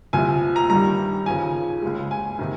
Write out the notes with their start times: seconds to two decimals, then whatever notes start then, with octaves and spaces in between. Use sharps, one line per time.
0.13 C2 C3 F3 G#5
0.56 A#5
0.70 G2 D#3 G3 A#5
1.26 D#2 C#3 F3 G#5
1.82 C#2 C#3 G#3
2.11 G#5
2.39 C3 D#3